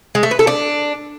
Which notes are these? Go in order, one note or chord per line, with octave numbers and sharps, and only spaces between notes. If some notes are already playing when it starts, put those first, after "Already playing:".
G#3
A3
B4
A4
D4